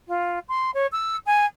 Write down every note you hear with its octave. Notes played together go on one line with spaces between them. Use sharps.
F4
C6
C#5
E6
G#5